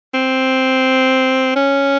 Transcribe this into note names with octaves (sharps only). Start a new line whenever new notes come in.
C4
C#4